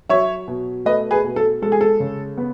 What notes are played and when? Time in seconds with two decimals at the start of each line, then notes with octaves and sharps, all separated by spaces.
0.09 F#3 C#5 E5
0.48 B2
0.85 A3 B4 D#5
1.11 G#4 B4
1.24 B2
1.36 A4
1.62 G#3 A4
1.72 G#4
1.81 A4
2.00 C#3
2.38 B3